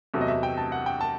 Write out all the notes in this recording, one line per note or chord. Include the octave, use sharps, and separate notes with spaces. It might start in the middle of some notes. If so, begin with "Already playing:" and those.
E2 C3 F#3 A3
D#5
E5
G5
A5
F#5
G5
A5